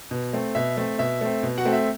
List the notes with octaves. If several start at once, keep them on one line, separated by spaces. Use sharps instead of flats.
B2
A3 C4
B2 E5
A3 C4
B2 E5
A3 C4
B2
F#4 F#5
A3 C4
E5